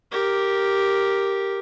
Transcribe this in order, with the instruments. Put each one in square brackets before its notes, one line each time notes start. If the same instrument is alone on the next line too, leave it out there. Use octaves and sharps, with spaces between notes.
[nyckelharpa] G4 A#4